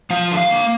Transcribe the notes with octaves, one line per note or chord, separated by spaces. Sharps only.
F3 F5
D3
F5
A#3